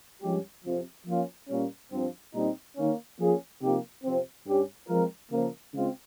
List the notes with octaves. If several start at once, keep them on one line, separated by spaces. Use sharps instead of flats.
G2 F3 G#3 C#4 G4
F2 C3 F3
F3 A#3 C#4 F4
A#2 G3 A#3 C#4
G2 F3 C4
A#2 G3 C4 D#4
D#3 A#3 C#4
F3 A#3 C#4 F4 G#4
C3 F3 A#3 D#4 G4
F2 C3 F3 C4
G2 G3 C#4 G4
F3 G#3 C4 F4 A#4
C#3 F3 A#3
C#3 G#3 C4 F4